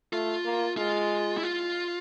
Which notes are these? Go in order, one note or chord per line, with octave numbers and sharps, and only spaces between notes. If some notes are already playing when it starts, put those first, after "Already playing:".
A3 F4
A#3
G#3 F4
E4
F4